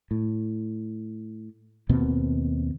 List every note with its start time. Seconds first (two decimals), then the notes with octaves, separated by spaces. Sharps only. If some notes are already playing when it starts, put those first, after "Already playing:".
0.11 A2
1.89 D#2 B2 A#3 C4